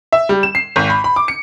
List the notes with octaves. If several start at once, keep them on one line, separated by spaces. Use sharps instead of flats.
E5
G3
E7
C7
G#1
B5
B5
D6
C#7